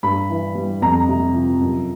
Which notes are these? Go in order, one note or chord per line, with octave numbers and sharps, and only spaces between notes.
G2 B5
E3
G3
F2 A#5
C3
F3
F#2